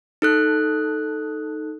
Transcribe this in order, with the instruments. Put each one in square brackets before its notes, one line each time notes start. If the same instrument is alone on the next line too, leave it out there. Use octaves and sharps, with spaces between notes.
[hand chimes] D#4 A4 F#6